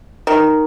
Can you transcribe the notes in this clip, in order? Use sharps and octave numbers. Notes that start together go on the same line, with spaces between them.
D#3